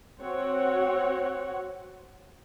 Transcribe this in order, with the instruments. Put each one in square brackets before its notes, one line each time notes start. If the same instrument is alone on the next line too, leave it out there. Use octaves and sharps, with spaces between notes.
[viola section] C4 F#4 C#5 F#5